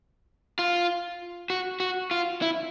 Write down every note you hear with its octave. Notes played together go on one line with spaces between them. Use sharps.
F4
F#4
F#4
F4
E4